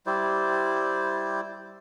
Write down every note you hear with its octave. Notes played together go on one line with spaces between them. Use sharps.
G3 E4 C5 D5